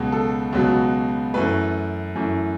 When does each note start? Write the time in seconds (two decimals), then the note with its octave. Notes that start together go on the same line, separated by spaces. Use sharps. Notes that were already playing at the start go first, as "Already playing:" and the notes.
Already playing: C#2 B2 F#3
0.12 A4
0.53 C#2 B2 F#3
1.34 F#2 E3 A3 B4
2.16 F#2 E3 A3